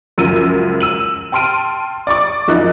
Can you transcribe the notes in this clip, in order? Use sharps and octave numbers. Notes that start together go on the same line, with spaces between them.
C#2 F#2 F3 E6 D#7
E6 D#7 F#7
G5 A5 C6 F6 D7 D#7
D5 C#6 D6
F#2 F3 D#4 E4 F#6